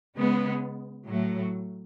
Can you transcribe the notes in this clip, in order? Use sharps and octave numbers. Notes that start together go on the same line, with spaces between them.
C#3 G#3 B3
A2 F#3 A3